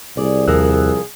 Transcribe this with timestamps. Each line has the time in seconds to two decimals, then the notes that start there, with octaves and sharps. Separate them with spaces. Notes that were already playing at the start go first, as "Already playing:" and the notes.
0.17 C2 G#4 D5
0.47 D#2 F3 G#4 A#4 E6 F#6